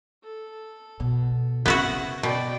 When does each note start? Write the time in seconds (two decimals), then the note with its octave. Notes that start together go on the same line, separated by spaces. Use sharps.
0.23 A4
1.00 B2
1.66 C#3 B3 C4 E4 F#4 F#5
2.23 B2 D5 G5